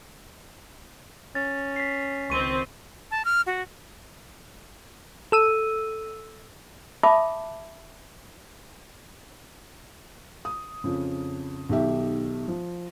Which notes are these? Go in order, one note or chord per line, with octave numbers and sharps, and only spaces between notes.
C#4 A6
B6 C7
C#2 D#3 C4 C#6 D#7
A5
F6
F#4
A4 E6 D#7
E5 A5 B5 D6 D#6
D#6
F2 C#3
B1 D#3 G4 E5
F3